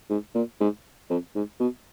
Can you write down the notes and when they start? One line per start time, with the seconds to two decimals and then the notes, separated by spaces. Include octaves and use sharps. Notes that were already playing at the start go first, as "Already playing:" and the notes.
0.10 G#2
0.35 A#2
0.61 G#2
1.10 F2
1.35 G#2
1.60 B2